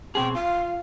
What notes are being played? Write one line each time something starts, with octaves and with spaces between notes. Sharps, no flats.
B2 C4 G#4 G5
F4 F5